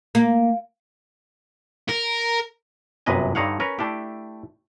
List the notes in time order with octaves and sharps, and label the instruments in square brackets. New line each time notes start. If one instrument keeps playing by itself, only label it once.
[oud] A#3
[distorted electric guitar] A#4
[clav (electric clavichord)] G1 F#2 C3 B4 D#5 G#5
G2 D3 D#4 C#5 F5 F#5
C#4 A#4 B4
A3 D4 E4 G4